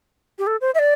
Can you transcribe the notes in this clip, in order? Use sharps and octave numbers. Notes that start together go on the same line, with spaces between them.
G4
A4
C5
E5
D5